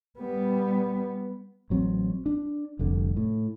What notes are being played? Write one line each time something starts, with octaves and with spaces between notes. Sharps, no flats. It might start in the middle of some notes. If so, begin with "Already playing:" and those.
G3 B3
A1 F#3 C4
D4
F1 C2 D3
A2